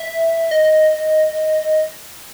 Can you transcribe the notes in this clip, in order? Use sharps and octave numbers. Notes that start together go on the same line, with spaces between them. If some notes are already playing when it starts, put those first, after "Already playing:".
Already playing: E5
D#5